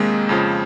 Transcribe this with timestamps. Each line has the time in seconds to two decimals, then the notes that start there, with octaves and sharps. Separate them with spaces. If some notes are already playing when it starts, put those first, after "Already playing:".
Already playing: F2 C3 D#3 G#3 A#3 C4
0.29 F2 C#3 F3